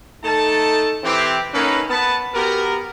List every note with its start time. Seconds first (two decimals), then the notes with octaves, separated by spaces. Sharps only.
0.24 A3 D#4 A4 A5
1.03 E3 C4 G4
1.53 A#3 C#4 D#4 A4 B4
1.89 B3 A5
2.34 B3 F#4 G4 A#4